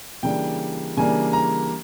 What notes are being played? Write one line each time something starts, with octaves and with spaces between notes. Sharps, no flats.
C#3 E3 G3 A#3 D4 G5
C#3 E3 G3 A#3 D4 G#5
A#5